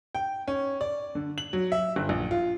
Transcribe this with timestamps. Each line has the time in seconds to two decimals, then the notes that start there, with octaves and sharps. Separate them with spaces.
0.15 G5
0.48 C#4
0.81 D5
1.15 D3
1.38 F#7
1.53 F#3
1.72 E5
1.96 G1
2.09 A#1
2.31 F4